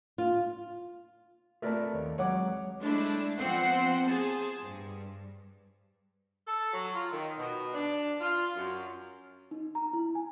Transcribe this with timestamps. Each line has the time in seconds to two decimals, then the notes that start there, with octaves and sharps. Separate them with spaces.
0.18 F4
1.62 A3 F4 A#4 B4 D5 A5
1.94 D#2 C#5
2.18 F#3 G#3 C#5 F#5 D6
2.80 G#3 A3 D4 E4 D5
3.37 F3 B3 C4 C5 F#5 C7
4.05 G#4 C5 A5
4.61 G2
6.47 A4
6.73 F#3
6.95 F4
7.12 D#3
7.38 B2
7.73 D4
8.20 F4
8.56 F#2
9.51 D#4
9.75 A#5
9.93 E4
10.15 G#5